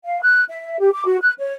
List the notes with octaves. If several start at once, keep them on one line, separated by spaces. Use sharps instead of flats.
F5
F#6
E5
G4
D6
F#4
F#6
C#5